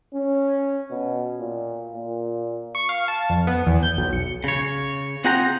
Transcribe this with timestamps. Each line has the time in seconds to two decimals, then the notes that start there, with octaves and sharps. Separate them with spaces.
0.14 C#4
0.91 B2
1.39 A#2
1.95 A#2
2.75 C#6
2.89 F5
3.08 A5
3.30 F2
3.47 B3
3.67 E2
3.83 G6
3.97 B1
4.13 C#7
4.44 C#3 C#5
5.24 C4 F4 G#4 F#5 G5 A#5